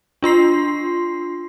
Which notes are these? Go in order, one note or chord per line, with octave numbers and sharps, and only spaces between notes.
D4 F4 C6 C7